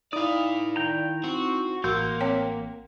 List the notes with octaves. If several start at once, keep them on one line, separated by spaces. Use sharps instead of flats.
D#4 E4 D5 F5 D#6
D#3 G5 A#5
C4 F#4
A1 A#3 F#4 F#5 C6 G6
C4 C#5 G5